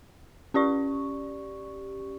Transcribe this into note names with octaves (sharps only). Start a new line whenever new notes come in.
C#4 G4 D5 C#6